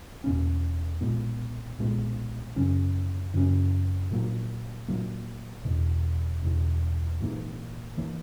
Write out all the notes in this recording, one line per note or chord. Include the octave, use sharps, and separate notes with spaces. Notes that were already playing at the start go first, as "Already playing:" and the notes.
E2 B2 A#3 C#4
B1 A#2 G#3 B3
B1 A#2 G#3 B3
F#2 C#3 F#3 C#4
F#2 C#3 F#3 C#4
A#1 A#2 F#3 A#3
A#1 A#2 F#3 A#3
E1 E2 B2
E1 E2 B2
A#1 G#2 E3 A#3
E3 A#3